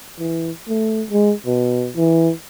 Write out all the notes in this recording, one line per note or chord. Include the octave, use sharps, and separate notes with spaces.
E3
A3
G#3
B2
E3